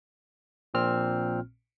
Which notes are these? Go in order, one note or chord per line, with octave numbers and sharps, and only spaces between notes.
A#1 A#2 C4 F6